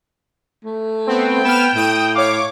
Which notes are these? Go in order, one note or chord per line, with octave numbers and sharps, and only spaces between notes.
A3
B3 C4 G5
B3 F6 E7
A2 D#6 D7 E7
C#5 F5 D6